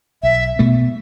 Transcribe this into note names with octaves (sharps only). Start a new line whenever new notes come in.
B1 E5
B2 A3